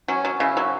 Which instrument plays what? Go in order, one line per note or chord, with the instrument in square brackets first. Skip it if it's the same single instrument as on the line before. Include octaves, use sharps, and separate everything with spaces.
[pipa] F#3 [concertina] C#4
[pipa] F#3
[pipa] C#3 [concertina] E4
[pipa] F#3